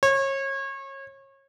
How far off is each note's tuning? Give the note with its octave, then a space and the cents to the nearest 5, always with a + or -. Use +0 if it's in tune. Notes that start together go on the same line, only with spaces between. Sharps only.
C#5 -30